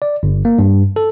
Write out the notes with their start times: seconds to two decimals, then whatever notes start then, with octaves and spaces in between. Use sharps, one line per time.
0.02 D5
0.23 G1
0.45 A#3
0.59 G2
0.96 A4